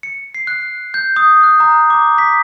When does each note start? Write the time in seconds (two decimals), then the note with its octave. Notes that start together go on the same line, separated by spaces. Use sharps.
0.03 C#7
0.35 C7
0.47 F#6
0.94 G6
1.16 D#6
1.43 F#6
1.60 A#5
1.90 D6
2.18 B6